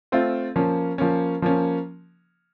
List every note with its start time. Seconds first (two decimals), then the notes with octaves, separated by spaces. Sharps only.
0.12 A3 C4 F4
0.56 F3 A#3 C#4
0.98 F3 A#3 C#4
1.42 F3 A#3 C#4